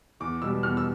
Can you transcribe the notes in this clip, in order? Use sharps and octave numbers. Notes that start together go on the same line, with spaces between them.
E2 D6
B2 G3 B3 E6
E2 F6
E6